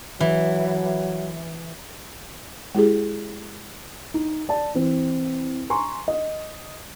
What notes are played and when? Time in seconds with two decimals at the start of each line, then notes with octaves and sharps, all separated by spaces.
0.21 E3 F#3
2.75 G#3 E4 G4 G#4
4.14 D#4
4.49 D5 A5
4.74 E3 C4
5.70 G#5 A#5 C6 C#6
6.08 D#5